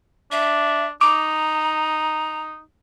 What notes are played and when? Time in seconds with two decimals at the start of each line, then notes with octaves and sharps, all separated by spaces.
0.32 D4 E5
1.01 D#4 A#5 D6